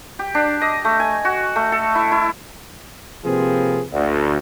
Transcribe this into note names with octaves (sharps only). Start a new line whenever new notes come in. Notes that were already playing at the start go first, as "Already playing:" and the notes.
G4
D4
D#5
A3
G#5
F#4
A3
A4
E4
E4
C3 F3 A#3 C4 G#4 B4
D2